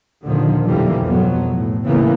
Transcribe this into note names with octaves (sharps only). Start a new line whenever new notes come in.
D#2 A#2 D3 D#3 F3
B1 F2 D#3 E3 G3 A#3
F2 G#2 B2 F#3 B3
A2
A2 C#3 E3 A#3 B3